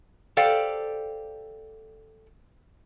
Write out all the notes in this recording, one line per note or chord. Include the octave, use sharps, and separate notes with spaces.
G4 A4 C5 D5 F5 G5